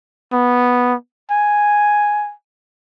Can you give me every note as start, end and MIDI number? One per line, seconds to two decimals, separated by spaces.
0.33 0.94 59
1.31 2.33 80